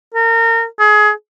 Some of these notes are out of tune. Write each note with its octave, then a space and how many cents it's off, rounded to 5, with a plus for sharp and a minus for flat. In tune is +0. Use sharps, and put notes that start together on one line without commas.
A#4 -30
G#4 +25